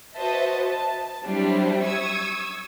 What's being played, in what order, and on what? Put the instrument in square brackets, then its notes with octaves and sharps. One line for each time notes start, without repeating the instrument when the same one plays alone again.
[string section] F#4 B4 C5 D#5 E5 A5
A5
F#3 G3 C4 D4 E4
C#6 D#6 E6 G#6